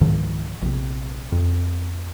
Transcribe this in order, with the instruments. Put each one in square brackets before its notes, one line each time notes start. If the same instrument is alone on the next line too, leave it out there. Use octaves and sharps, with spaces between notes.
[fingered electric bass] C#2 G#2 D#3 F3
A#1 C3
F2